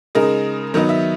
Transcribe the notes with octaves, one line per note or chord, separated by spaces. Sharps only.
C#3 G#3 D#4 A#4
D#3 F#3 B3 D#4 A#4
E5